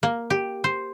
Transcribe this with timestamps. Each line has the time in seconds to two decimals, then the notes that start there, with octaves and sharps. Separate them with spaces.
0.03 A#3
0.30 G4
0.64 C5